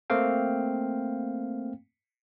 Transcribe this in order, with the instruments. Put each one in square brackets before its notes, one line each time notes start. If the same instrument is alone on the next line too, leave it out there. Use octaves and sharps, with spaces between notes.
[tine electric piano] A3 A#3 C4 F5 G5